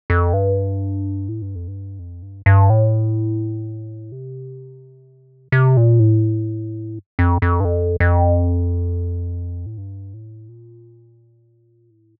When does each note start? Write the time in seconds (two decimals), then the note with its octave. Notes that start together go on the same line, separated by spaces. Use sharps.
0.10 F2
0.33 G2
1.28 A2
1.42 G2
1.55 F2
1.68 G2
1.99 F2
2.22 G2
2.46 G2
2.70 A2
4.12 C3
5.52 C3
5.77 A#2
6.00 A2
7.19 F2
7.42 F2
7.60 G2
7.65 F2
8.00 F2
9.66 A2
9.77 G2
10.14 A2
10.49 A#2
11.90 A2